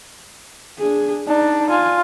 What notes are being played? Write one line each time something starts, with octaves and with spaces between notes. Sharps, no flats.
D4 G#4
D4 D#4
F4 G#5